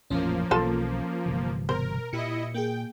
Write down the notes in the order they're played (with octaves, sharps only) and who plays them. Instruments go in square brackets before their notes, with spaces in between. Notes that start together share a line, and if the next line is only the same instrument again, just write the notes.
[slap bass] A1 F2 A#2 [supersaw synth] F3 A#3 [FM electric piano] C#4
[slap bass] B1 E3 F#3 [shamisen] F4 A4 A5
[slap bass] G1 C3 E3
[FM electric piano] B2 [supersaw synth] A#4 [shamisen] C5
[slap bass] A#2 [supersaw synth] E4 D#5 [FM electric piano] G4 C#7
[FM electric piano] A#3 G#4 [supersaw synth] G5